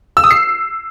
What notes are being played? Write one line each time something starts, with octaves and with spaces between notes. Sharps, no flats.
E6
D#6
C7